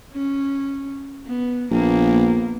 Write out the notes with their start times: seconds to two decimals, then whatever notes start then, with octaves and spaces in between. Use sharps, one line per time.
0.12 C#4
1.26 B3
1.71 A#1 A#3 B3